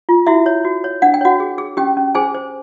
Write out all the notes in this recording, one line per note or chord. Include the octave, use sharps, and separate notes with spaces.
F4
E4 F#4 E5
C#5
F#4
C#5
D4 F#5
G5
F#4 C#5 F#5
G#4
G#4
C#4 G4 G5
C#4
G#4 C5 G#5
C5